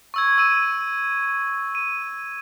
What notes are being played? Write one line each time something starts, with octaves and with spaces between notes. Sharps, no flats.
C#6 E6 G#6
E6 D#7
D#7